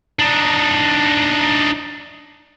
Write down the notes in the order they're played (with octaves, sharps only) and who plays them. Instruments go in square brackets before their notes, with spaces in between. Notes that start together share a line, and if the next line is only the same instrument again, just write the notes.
[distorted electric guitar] D4 D#4